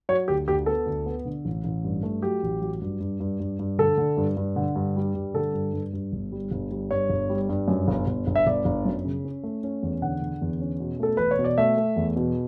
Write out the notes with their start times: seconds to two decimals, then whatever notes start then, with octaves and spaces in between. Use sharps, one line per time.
0.09 F#3 C#5
0.28 D2 G4
0.48 D2 G4
0.66 B3 A4
0.86 D2
1.06 B3
1.25 D3
1.45 A1
1.64 A1
1.84 G2
2.03 A3
2.22 F#3 G4
2.43 A1
2.61 F#3
2.81 G2
3.00 G2
3.20 G2
3.40 G2
3.59 G2
3.78 D3 A4
3.98 D3
4.17 G2
4.37 G2
4.56 D3
4.76 G2
4.96 G3
5.15 G2
5.34 D3 A4
5.54 G2
5.73 G2
5.93 G2
6.13 G1
6.32 G3
6.51 G1
6.71 G3
6.90 G2 C#5
7.09 G1
7.29 G3
7.49 G2
7.68 F#2
7.88 G1
8.07 G1
8.27 G1
8.36 E5
8.47 G1 D5
8.65 G1
8.85 F#2
9.05 C#3
9.24 C#4
9.43 A3
9.64 C#4
9.83 E2
10.02 D3 F#5
10.22 D3
10.41 E2
10.60 C#4
10.80 B2
10.99 A3 A4
11.17 E1 B4
11.31 C#5
11.39 B2
11.44 D5
11.58 A3 E5
11.77 A3
11.96 E2
12.16 B2